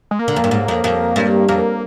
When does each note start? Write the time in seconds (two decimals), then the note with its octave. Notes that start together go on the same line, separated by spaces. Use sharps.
0.11 G#3
0.19 A#3
0.28 D3
0.36 F2
0.44 G2
0.51 G#2
0.68 F2
0.84 F2
1.16 G2
1.49 F2 A#3